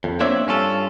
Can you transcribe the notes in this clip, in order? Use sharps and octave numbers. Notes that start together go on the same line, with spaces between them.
F2
A#3 C4 D4 C#5 E5
G2 C#4 F4 A4